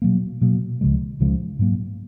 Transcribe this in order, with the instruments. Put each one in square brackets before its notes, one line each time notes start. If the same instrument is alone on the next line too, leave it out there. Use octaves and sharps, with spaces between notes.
[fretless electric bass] B2 F#3 A#3
B2 F#3 A#3
C#2 C#3 F3 G#3
C#2 C#3 F3 G#3
G#2 F#3 A#3